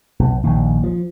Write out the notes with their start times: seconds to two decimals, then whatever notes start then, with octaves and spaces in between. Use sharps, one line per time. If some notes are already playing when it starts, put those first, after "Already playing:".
0.19 B1
0.44 A#1 D#2
0.83 F3